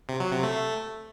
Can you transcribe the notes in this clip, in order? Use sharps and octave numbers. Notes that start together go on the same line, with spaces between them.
C3
F#3
C3
A3